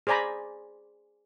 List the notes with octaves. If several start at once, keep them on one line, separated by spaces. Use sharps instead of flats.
G#4 C5 D5 G#5 A#5 B5